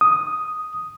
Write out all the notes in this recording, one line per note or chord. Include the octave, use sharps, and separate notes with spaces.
D#6